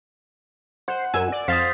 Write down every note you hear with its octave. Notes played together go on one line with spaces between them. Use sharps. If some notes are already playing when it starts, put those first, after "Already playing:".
C5 F#5
F#2 G#5 E6 G#6
D5
F2 C5 F5 D#6 A6 B6